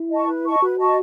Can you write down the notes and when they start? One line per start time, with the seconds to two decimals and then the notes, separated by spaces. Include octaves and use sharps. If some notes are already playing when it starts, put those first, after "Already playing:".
Already playing: E4
0.11 D#5 A5 C#6
0.27 B4
0.45 D#5 A5 C#6
0.62 F#4 B4
0.79 D#5 A5 C#6